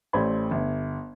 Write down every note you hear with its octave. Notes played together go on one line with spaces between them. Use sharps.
A1 A3 C5 D5 B5 G#6
G1